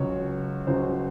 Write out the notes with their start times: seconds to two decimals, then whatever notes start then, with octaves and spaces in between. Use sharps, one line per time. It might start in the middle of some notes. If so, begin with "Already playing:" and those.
Already playing: C#2 C#3 F#3 C#5
0.67 C#2 C#3 F#3 C5